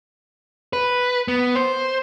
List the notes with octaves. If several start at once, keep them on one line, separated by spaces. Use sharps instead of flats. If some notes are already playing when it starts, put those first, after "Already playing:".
B4
B3
C5